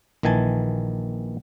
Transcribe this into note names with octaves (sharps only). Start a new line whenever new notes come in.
A#1 D#3 E3 G#5 A5